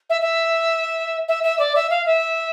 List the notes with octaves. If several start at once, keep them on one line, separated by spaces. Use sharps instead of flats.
E5
E5
E5
E5
D5
E5
F5
E5